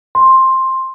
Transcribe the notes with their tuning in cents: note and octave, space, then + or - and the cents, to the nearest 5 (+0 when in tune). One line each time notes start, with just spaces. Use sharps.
C6 +10